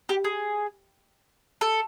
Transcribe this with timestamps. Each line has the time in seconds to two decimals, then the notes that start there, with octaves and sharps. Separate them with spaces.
0.09 G4
0.24 G#4
1.61 A4